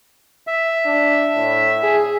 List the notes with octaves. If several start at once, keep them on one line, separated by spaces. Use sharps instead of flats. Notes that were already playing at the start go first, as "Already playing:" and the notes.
E5
D4
A2
G#4